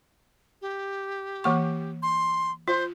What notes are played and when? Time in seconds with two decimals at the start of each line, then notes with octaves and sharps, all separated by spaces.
0.62 G4
1.44 E3 A#3 C#6
2.03 C6
2.68 F4 C5